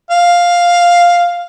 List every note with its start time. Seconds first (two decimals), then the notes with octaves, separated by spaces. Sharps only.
0.11 F5